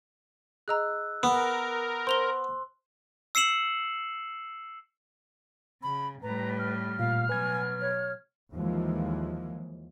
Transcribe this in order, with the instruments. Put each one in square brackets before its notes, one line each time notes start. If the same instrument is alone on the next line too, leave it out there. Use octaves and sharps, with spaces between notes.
[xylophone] G#4 D#5 A#5 [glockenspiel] E6 F#6
[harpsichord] B3 [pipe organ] A#4
[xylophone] C5 F7 G7 [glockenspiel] C6
[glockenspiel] E6 C7 C#7 E7 F#7
[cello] C#3 [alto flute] B5
[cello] A2 G3 [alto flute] B4 [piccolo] A#5
[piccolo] F6
[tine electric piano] A#2 [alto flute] F5
[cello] B2 F#3 [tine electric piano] B4 G#6 [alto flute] G#5
[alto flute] C#5
[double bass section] D#2 E3 F3 G#3